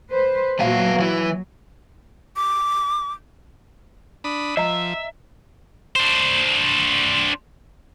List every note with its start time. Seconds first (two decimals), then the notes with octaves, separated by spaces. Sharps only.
0.11 B4 C5
0.60 A#2 F#3 B3 F#4 F5
0.99 E3 F#3 E4
2.36 D6
4.24 D4 B5 D#6
4.57 F3 D#5 E5 A#5
5.96 D4 C5